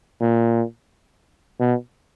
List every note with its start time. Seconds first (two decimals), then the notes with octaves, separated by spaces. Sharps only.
0.21 A#2
1.60 B2